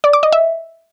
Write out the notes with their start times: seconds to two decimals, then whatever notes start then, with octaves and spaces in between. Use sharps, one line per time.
0.04 D5
0.13 D6
0.23 D#5
0.32 E5